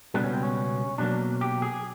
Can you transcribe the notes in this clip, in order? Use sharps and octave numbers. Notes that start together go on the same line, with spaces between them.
C#2 B2 G3 B3 D4
C#4
C4
C#4
B2 F#3 A#3 D4
G4
G#4